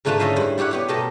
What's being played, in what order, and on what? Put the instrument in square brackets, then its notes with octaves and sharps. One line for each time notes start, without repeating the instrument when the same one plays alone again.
[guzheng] G#2 D3 A3 F4 B4 A5
C#4 E4 F4 C5 D#5 E5
G2 E4 C5
G3 E4 G4 C#5 F#5
B3 G4 C#5
B2 A3 G4 A#4 D#5 A5